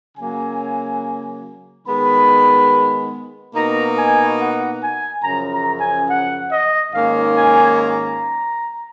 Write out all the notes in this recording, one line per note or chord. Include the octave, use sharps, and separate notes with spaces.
C#3 F#3 A#3 G#5
D#3 G#3 B3 B5
B2 A#3 D#4 A#5
G#5
F#5
G#5
F#2 C#3 F3 A#5
A#5
G#5
F#5
D#5
G#2 D#3 A#3 C#4 F5
G#5
A#5